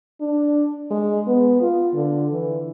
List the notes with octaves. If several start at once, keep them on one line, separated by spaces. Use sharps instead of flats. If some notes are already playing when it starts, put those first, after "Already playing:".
D4
G#3
B3
F4
D3
E3